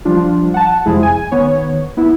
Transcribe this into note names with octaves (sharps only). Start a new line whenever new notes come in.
F3 G3 D4 F4
F#5 A5
F2 C3 F3 G#3 E4 G#4
G#5
D#3 B3 C#5
B3 E4